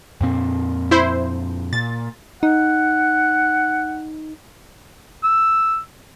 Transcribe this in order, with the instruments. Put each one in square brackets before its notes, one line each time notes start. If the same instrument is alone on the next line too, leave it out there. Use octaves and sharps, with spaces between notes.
[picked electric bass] F2 A#2 C4
[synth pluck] E4 C5
[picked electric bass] A#2 [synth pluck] A6
[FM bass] D#4 [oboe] F#5
[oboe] E6